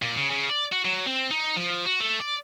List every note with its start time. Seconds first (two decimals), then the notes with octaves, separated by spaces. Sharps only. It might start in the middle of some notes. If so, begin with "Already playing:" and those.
0.02 A#2
0.17 C#3
0.30 C#3
0.49 D5
0.72 F#4
0.85 F#3
1.06 C4
1.31 D#4
1.56 F3
1.85 F#4
2.00 A3
2.20 D5